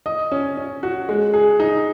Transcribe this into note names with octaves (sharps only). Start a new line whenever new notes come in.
D#5
C#4
C#4
F#4
G#3
G#4
D#4